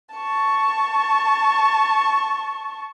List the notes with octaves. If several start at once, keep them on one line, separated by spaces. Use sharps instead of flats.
A5 C#6